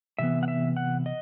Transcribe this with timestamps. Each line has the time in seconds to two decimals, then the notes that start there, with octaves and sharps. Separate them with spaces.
0.19 C3 E3 B3 E5
0.43 F#5
0.48 E5
0.77 F#5
1.06 D#5